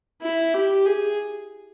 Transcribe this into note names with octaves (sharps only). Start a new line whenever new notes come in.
E4
G4
G#4